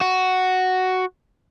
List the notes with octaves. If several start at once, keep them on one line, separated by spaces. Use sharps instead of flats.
F#4